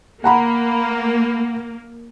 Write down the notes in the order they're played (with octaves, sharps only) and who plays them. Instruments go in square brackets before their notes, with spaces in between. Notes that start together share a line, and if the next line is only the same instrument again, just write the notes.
[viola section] A#3 [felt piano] F#5 A#5 B5